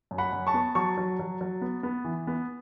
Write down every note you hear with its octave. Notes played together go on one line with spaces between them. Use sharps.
F#2
F#5 B5
F#2
A5 C#6
B3
F#3 A5 C#6
F#3
F#3
F#3
B3
B3
E3
B3